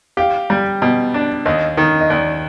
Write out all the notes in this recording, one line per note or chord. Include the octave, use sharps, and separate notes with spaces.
G4 F5
G3
B2
D4
D#2 D#5
D#3
D#5
D#2 D5